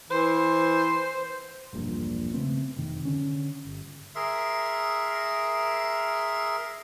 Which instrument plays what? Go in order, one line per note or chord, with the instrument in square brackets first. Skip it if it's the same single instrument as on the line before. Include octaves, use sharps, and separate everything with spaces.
[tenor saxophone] E3 [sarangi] C5
[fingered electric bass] E1 A#1 G2 A#2
C#3 A3 B3 C4
F1 F2 C3 D#3
D3 C#4
G1
[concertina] G#4 A#4 E5 C6